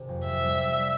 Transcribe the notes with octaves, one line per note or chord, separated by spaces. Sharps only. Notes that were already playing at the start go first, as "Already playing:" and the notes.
Already playing: G#1 C3
F2
C4 E5
G3
F4